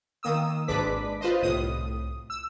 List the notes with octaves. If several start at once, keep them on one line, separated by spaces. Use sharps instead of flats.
D#3 A#3 D#6 E6
G#1 G#3 D4 B4 D6 B6
F4 B4 C5 D#5
C2 A2 D#6
E6